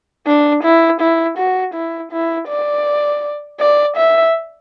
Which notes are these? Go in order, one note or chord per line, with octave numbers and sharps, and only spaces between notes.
D4
E4
E4
F#4
E4
E4
D5
D5
E5